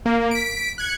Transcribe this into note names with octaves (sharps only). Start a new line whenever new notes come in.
A#3
B6 D7
F#6 G#6 C#7